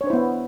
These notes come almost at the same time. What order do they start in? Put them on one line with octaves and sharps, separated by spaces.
C#5 D4 C5 E4 B3